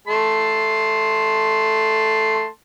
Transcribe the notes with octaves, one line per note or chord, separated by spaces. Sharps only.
A3 A5 C6